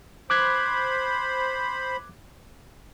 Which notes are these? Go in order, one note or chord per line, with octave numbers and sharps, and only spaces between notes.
C5 B5 D6 F#6 G#6